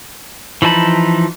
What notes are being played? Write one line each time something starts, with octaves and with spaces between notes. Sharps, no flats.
E3 F3 D#4 A5 B5